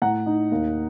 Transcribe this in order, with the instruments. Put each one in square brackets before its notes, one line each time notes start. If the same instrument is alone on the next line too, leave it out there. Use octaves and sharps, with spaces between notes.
[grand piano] A2 F#5 A#5
D#4
D#2